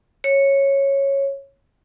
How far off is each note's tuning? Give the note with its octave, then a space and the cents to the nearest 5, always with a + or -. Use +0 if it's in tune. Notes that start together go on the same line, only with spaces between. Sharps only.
C#5 -10